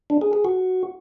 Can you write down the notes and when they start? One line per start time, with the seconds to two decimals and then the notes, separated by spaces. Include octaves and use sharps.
0.10 D4
0.21 G#4
0.33 G#4
0.45 F#4